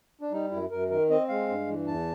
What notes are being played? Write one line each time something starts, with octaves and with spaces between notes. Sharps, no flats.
D4
G3 D#4
F#2 E4
F#2 A#4
D#3 A#4
C4 D#5
G#3 F5
G2
E3
E2 A5